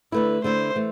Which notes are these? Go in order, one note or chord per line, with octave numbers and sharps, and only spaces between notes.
D3 A3 E4 B4
D3 A3 E4 C5
E3 A3